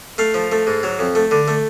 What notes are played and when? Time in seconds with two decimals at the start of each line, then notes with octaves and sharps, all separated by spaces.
0.18 A3 F5
0.34 F3
0.52 A3
0.67 G#2
0.83 F#3
0.99 F2
1.15 A3
1.31 D3
1.48 A3